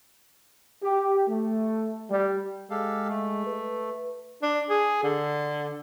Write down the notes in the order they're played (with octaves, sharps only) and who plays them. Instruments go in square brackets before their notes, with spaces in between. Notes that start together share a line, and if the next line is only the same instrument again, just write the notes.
[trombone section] G4
A3
G3
[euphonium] G#3 [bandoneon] G4 A4 F5
[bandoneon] A3
[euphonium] B4
[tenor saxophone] D4
G#4
D3